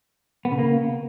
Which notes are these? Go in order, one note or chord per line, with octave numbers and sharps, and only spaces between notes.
B3
C#3
A#3